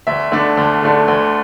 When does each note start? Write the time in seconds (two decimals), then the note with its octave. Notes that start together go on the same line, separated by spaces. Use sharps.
0.07 D2 E5
0.32 D3 A3 D4
0.57 D2
0.82 D3 A3 D4
1.08 D2